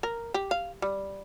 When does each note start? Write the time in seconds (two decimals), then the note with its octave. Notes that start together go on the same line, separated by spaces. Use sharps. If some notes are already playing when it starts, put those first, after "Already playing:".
0.03 A#4
0.34 G4
0.51 F5
0.82 G3